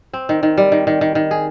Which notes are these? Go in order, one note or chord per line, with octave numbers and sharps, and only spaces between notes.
C4
D#3
D#3
G3
D#3
D#3
D#3
D#3
G#4